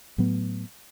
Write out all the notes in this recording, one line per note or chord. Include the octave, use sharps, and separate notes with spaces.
A2 F#3 B3